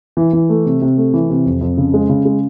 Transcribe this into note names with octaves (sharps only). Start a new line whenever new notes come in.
E3
E3
A3
C3
C3
A3
E3
C3
F2
F2
C#3
G#3
C#3
G#3